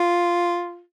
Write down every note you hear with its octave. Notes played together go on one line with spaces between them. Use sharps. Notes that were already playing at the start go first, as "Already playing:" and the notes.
Already playing: F4